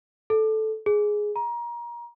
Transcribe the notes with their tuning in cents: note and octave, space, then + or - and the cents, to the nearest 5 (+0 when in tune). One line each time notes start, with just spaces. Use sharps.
A4 -10
G#4 +5
A#5 +25